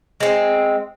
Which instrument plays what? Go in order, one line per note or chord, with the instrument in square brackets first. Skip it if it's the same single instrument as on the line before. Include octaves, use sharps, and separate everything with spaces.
[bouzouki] G#3 C4